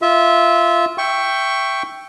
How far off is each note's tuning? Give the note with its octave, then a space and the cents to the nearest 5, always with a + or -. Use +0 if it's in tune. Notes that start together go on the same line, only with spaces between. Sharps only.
F4 -15 E5 -15
E5 +10 G5 +0 C#6 +0